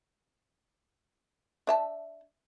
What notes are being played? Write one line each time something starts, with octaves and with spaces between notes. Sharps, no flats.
D4 E5 A5